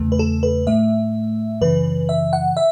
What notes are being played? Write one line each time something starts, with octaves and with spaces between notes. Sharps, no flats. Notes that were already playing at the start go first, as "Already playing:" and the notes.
Already playing: E2 C#3 A3
B4
A4
B4
A2 A3 E5
F#2 C#3 E3 B4
E5
F#5
E5